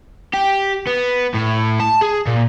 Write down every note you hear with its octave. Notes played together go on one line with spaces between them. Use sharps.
G4
B3
A2
A5
G#4
A#2